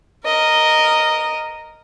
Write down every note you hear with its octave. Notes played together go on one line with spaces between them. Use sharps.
A#4 D#5